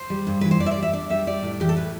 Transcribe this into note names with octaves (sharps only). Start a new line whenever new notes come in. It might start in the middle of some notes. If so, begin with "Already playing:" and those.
Already playing: C5
G3
G2
E3 B4
C5
G2 D5
E5
D5
G3
E5
D4 D5
G3 E5
G3 D5
A2
E3 G4
A4
A2 B4